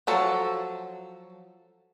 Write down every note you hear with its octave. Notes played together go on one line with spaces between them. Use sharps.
F3 F#3 A4